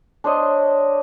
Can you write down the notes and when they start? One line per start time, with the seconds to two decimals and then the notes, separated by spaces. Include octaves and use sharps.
0.24 D4 C5 C#5 D#5